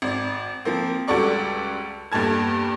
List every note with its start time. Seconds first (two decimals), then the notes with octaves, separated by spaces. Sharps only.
0.02 G#1 D5
0.65 F3 A#3 C4
1.08 C#2 G3 F#4 A4 D5 C#6
2.12 E2 G2 A#2 A4 A5 G#6